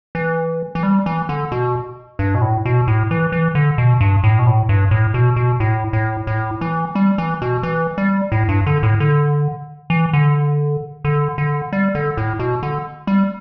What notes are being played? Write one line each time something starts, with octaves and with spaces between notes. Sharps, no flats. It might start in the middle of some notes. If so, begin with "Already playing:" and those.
E3
E3
G3
E3
D3
B2
G2
B2
A2
B2
A2
E3
E3
D3
B2
G2
A2
B2
A2
G2
A2
B2
B2
A2
A2
A2
E3
G3
E3
B2
E3
G3
A2
G2
D3
A2
D3
E3
D3
D3
D3
G3
D3
A2
B2
D3
G3